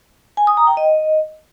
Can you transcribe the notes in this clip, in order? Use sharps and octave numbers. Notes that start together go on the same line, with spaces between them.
G#5
D#6
A#5
G5
D#5